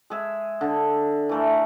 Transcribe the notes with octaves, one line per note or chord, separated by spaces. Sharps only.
G#3 G#4 E5
D3
E3 A3 A#4